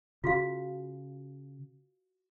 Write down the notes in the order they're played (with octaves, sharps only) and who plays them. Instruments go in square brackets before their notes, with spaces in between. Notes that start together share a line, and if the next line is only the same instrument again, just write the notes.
[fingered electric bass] C#3 [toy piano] F4 F#4 F5